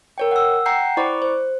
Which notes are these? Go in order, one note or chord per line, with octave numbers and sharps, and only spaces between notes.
A#4 C#5 G5
F#5 E6
F#5 G5 A#5 G6 C7
E4 C5 D5 B5 C#6 D6
C5